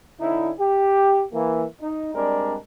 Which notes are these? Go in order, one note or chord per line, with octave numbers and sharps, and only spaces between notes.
D3 C#4 D#4 E4
G4
E3 A#3
D#4
G3 G#3 C4 D4 A#4